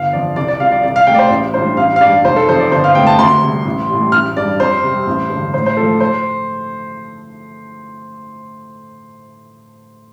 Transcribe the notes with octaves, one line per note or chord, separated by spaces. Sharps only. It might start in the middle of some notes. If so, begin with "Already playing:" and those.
Already playing: G1 F5
F2 F3 D5
C2 D5
D5
C3 G3 F4 F5
D5
C2 D5
F5
C3 A3 G5
D5
C5
A1
A2 G3 D4 F4 C5
A1 F5
F5
G2 G3 D5
F1 C5
A4
F2 C3 F3 C5
D5
G1 C5
F5
F2 C3 A3 G5
A5
D2 C6
C3 G3
A1
A2 G3
A1 F6
G2 G3 D5
F2 C5
C3 G3 C4
A1
G2 D3
A2 C5
C5
F3 A3 F4 A4
C5